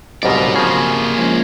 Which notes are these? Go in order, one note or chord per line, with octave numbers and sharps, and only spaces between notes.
C#2 G#2 B2 F#3 G3 C4 A#4 D5
C#3 F3 A#3 G#4
F3 G#3 C#4